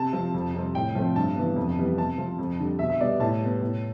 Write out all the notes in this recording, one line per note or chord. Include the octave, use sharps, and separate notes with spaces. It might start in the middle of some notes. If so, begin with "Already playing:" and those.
Already playing: C3 A5
F3 C4
F2
C3 G3 C4
A2 G5
F3 A3 C4
G2 A5
E3 B3
F2
E3 G3 B3
C3 A5
F3 C4
F2
D3 G3
B2 E5
E5
G3 B3 D5
A2 A5
G3 B3
A2